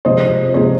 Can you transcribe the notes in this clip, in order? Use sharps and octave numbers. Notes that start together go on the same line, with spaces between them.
C3 F3 G#3 C5 D#5
C3 F3 G#3 G#4 C5